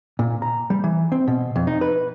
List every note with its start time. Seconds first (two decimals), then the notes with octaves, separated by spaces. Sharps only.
0.19 A#2
0.42 A#5
0.70 G3
0.84 E3
1.12 C4
1.28 B2
1.56 F2
1.67 D#4
1.81 B4